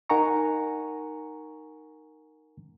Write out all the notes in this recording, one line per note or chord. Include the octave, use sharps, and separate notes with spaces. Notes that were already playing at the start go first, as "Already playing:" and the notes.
D#4 A#4 F#5 G#5 A#5 C#6